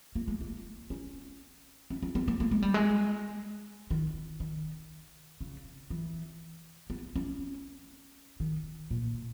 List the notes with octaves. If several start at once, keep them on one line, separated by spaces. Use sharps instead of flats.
A#3
G#3
A#3
C#4
C#4
C#4
B3
A#3
A#3
G#3
G3
G#3
D#3
D#3
C#3
E3
B3
C#4
D#3
A#2